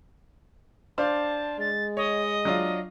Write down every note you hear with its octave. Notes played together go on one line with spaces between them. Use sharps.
D4 C5 F5 A5
G#3 A6
C#5 D#5
F#3 D4 F4